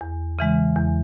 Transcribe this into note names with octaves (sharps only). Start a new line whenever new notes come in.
E2
C#3 E3 G#3
E2